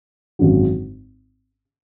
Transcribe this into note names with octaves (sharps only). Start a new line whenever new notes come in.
G#1 F#2 D3 F#3